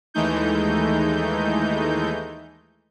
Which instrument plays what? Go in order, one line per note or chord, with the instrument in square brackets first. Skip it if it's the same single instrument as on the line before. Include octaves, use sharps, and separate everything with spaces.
[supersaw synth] D#2 E3 G#3 A3 D#4 G6